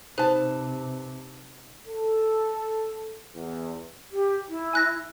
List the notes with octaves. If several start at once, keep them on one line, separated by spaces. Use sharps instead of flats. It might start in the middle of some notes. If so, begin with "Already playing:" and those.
C3 D#4 B4 C5 A5
A4
E2
G4
E4
G#5 F#6 A#6